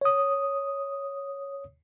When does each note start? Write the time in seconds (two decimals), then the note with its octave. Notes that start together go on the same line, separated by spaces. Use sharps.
0.01 C#5 D#6